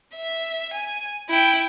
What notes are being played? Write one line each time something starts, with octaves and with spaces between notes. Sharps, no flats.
E5
G#5
E4 G5